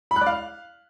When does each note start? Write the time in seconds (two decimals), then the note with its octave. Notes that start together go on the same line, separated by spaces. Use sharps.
0.11 B5
0.16 F#6
0.21 D5
0.26 F5